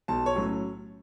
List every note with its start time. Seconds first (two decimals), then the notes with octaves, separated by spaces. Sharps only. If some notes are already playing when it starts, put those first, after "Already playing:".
0.08 B1 A5
0.26 C#5
0.35 A2 F#3 C#4